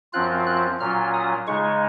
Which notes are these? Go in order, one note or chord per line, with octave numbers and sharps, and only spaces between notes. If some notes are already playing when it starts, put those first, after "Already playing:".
F#2 F3 C4 F4 F#6
F#6
A#2 F#3 C#4 F4 F6
D#6
C#3 G#3 D#4 C#6